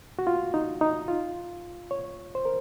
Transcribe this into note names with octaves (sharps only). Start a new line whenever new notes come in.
F#4
F4
D#4
D#4
F4
C#5
C5
A#4